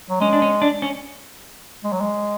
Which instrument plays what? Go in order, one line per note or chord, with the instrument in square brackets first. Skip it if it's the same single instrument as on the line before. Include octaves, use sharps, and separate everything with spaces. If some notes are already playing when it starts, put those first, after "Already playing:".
[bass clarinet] F#3
[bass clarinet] G#3 [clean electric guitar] C#4
[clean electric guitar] D4
C#4
D4
C#4
[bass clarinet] G#3
F#3
G#3